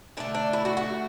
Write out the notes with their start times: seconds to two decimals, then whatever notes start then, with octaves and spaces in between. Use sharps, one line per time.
0.17 D3 A3 D4
0.35 D4
0.53 E4
0.65 F#4
0.77 F#4